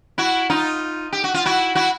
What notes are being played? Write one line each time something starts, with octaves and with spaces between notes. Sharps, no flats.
E4 F#4
D#4 F4
G4
F#4
F4
E4 F#4
E4 F#4